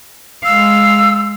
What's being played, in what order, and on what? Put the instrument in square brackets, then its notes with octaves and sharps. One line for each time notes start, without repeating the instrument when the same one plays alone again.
[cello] G#3 F5 [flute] E6